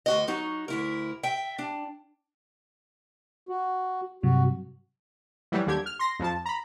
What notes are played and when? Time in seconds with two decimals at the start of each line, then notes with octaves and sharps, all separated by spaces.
0.06 D2 F#4 D#5
0.28 F#3 D#4 F#4
0.68 D2 E4 A#4
1.23 E5 G5
1.59 D4
3.49 F#4
4.23 G2 C3 F#3 F#4
5.52 E3 F#3 G3
5.67 D#2 D3 G4 G#6
5.86 F6
5.99 C6 A#6
6.19 F2 F3 A5
6.45 A#5 B5